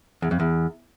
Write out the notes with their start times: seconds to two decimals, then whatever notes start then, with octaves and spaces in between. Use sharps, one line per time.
0.22 E2
0.31 F2
0.40 E2